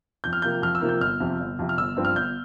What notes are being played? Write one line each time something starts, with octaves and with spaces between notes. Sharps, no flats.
F2 G6
F6
C3 F3 A#3 G6
F2 F6
E6
C3 F3 A#3
G6
G1 F6
F2 C3
G1
F2 C3
F6
G1 E6
G2 F3 C4
F6
G1 G6